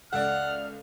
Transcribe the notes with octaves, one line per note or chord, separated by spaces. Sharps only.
C#2 A4 D5 E5 F#5 F6